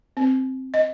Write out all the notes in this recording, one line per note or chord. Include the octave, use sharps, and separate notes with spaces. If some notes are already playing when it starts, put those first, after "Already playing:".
C4
D#5